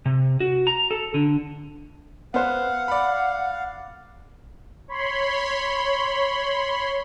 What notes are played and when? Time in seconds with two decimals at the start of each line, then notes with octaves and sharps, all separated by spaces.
0.06 C3
0.40 F#4
0.67 A#5
0.91 A4
1.14 D3
2.34 B3 C5 F5 F#5
2.88 D5 B5
4.88 C#5 B5 C6